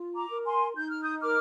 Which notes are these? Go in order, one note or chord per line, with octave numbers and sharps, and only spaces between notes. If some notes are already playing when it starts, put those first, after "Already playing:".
Already playing: F4
A#5 D6
A#4
G#5 C6
D#4 G6
F6
D#6 G6
A#4 D6 F6